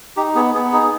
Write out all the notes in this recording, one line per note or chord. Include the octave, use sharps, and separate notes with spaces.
D#4 G4
B3 G#4
B3 G#4
D#4 G#4